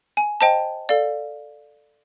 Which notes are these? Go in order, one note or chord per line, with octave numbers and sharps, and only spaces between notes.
G#5
C5 D#5 G5 A5
A4 D5 F5